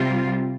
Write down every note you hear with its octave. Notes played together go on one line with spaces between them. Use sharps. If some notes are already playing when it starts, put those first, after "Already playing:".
Already playing: C3 G3 C4 F4